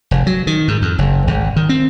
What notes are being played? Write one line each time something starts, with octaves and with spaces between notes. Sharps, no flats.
F1
F#3
D#3
G#2
F2
F#1
G#1
D#3
C4